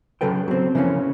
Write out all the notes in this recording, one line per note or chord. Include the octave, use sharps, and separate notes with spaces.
C#3 F#3 A4 B4 G5
F#3 C4
C#3 E3 F3 A#3 B3 C#4